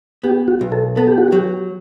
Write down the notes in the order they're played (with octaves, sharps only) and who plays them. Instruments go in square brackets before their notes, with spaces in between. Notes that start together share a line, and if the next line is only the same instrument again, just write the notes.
[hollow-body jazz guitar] B3 [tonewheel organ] G4
[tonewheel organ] F#4
[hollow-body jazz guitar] B1
[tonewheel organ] A4
[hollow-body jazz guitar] B3 [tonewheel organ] A4
[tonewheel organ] G4
F#4
[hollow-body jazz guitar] F#3 [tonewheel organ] G4